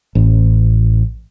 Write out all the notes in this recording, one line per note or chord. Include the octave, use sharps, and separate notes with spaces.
A1